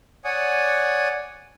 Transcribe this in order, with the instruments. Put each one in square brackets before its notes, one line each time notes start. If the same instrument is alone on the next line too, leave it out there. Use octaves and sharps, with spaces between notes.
[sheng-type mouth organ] C#5 D5 F#5 G#5 D#6